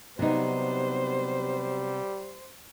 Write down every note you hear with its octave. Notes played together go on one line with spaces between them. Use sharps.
C3 F#3 G3 B3 D#4 C5